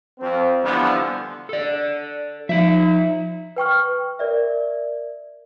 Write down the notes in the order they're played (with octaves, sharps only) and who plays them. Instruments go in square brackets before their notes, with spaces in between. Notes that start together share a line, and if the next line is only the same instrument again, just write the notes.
[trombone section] F2 C4
D3 E3 F3 G3 B3
[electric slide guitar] A4 D5
[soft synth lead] F3 [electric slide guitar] D#4 E5
[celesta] B4 G5 C#6 F6
A#4 D5 E5